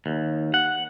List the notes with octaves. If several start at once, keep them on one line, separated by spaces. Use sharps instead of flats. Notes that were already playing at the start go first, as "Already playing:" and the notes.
D#2
F#5